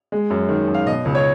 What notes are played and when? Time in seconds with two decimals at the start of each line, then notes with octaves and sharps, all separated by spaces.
0.12 G#3
0.30 F#2
0.49 D#3
0.68 F#2
0.74 F5
0.86 B2 D#5
1.05 C#2
1.15 C#5